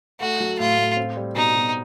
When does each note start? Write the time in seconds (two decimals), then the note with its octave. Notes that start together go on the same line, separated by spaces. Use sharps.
0.20 A3 F#4
0.40 F#3
0.59 A2 F4
0.77 A2
0.97 C4
1.17 G3
1.35 B2 D#4
1.55 B2